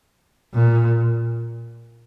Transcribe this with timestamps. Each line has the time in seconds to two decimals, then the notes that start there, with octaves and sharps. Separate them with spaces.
0.54 A#2